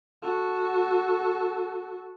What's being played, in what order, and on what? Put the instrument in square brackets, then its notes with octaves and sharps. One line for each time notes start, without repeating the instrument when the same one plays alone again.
[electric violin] F#4 A4